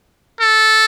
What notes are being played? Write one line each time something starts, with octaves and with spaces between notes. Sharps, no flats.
A4